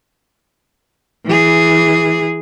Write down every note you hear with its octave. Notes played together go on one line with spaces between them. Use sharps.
E3 G#4